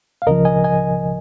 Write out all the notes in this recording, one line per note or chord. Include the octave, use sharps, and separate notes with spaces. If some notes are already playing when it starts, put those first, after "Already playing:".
F5
C#2 C#3 F3 A#4 D#5
D#5 G#5
D#5 G#5